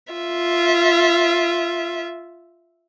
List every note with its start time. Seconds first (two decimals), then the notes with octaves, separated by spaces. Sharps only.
0.13 F4 E5